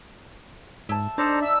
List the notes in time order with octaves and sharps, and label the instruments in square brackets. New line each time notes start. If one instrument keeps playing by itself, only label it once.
[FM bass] G#2 [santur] E5 A5
[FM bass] D4 [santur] D#4 D5 [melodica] A4 C5 A#5
[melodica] E5 [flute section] E6